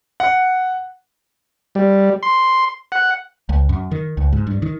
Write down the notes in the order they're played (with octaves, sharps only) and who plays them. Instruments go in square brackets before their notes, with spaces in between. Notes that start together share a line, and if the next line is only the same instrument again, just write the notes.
[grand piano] F#5
[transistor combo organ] G3
C6
F#5
[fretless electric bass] C#2
F#2
D#3
C#2
G#2
G2
D#3